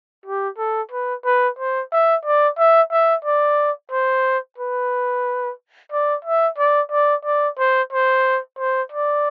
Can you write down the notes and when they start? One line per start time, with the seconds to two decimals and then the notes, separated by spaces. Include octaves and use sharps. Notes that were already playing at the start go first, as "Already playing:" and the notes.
0.26 G4
0.58 A4
0.91 B4
1.25 B4
1.59 C5
1.92 E5
2.25 D5
2.58 E5
2.92 E5
3.24 D5
3.91 C5
4.58 B4
5.92 D5
6.25 E5
6.58 D5
6.92 D5
7.25 D5
7.59 C5
7.92 C5
8.59 C5
8.92 D5